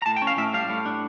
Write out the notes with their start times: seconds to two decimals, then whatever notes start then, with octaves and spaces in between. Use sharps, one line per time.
0.02 A#5
0.06 A2 A5
0.17 G5
0.22 C#4
0.27 F5
0.38 A2 E5
0.54 G3 F5
0.70 A2
0.86 D4